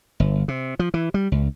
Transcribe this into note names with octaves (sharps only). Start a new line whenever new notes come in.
G1
C3
F3
E3
G3
C#2